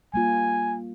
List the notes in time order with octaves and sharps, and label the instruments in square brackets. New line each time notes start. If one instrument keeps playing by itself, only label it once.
[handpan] G3 A#3 F4 [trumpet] G#5